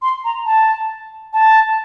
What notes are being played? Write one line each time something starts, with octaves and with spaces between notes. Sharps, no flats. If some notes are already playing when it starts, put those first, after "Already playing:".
C6
A#5
A5
A5